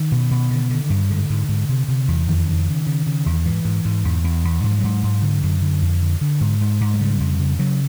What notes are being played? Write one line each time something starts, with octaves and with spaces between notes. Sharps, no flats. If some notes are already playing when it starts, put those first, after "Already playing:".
Already playing: D#3
B2
B2
D3
D3
G2
G#2 D3
G#2
G#2
C3
C3
E2
F2 D#3
C#3
C#3
C#3
C#3
E2
G#2 E3
G#2
G#2
E2
E2
E2
G#2 F#3
F3
F#3
G#2
G#2
D3
F#2
D3
F2
D3
D3
G#2
G#2
G#2
G#3
C#3 G3
F2
C#3
C#3 F#3